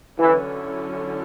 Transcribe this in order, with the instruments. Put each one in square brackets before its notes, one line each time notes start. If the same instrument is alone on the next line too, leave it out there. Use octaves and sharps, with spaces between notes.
[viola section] D3 F#3 C#4 E4 [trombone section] E3